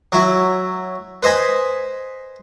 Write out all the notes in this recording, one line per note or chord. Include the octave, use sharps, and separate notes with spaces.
F#3 E4
B4 C5 D#5 G#5 B5